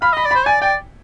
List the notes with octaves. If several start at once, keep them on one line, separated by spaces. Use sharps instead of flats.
F5 B5
D#5 B5
D5
B5
C5
D5 G#5
D5 G5